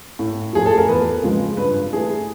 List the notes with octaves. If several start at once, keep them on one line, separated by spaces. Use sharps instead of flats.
A2
F3 A3 G#4
A4
A#4
E2 B4
C#3 F3 G#3
G2 B4
E3 A3 G#4